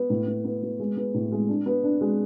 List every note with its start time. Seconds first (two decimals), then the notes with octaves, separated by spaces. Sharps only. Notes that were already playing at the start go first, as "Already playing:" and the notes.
Already playing: B3
0.10 A2
0.27 B3
0.44 B3
0.63 B3
0.79 G#3
0.97 B3
1.14 A2
1.32 G#3
1.49 D4
1.66 B3
1.84 D4
2.01 G#3